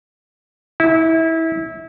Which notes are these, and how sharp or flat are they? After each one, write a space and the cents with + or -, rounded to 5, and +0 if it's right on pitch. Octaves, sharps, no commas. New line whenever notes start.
E4 -25